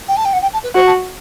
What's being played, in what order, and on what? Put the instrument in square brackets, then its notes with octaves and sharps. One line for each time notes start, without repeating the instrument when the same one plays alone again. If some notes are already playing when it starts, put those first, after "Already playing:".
[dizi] G5
A5
G5
F#5
G5
A5
B4
[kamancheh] F#4 [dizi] C5
[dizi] A5